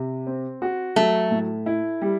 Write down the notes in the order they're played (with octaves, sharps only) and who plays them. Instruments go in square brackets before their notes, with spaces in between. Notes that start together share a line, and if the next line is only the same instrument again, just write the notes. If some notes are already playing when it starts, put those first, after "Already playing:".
Already playing: [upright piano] C3
C4
F#4
[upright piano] F#3 [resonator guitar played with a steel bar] A3
[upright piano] A2
E4
G3